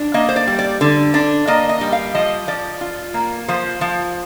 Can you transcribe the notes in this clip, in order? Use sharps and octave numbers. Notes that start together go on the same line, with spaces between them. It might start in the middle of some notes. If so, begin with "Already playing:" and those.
Already playing: D4
A#3 D#5
C5
D5
G3
D5
D3 D5
D4 D5
A#3 D#5
D#5
G3
F5
F3 D#5
F3 D5
F4
A#3
F3 C5
F3